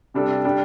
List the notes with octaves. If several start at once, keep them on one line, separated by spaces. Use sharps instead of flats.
C3 G3 D4 A4
G3 D4 G4